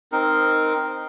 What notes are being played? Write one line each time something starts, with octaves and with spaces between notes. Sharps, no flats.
C4 D#4 A#4